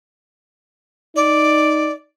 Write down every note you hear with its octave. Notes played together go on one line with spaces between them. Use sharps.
D#4 D5